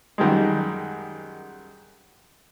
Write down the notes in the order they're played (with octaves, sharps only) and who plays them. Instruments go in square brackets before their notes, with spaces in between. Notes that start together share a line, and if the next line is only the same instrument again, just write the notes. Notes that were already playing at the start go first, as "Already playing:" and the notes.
[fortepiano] F#2 D#3 G3 G#3